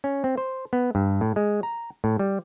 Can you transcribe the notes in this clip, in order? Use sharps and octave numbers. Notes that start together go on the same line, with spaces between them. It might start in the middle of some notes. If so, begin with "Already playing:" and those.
C#4
C4
C5
B3
G2
A2
G#3
A#5
A2
G3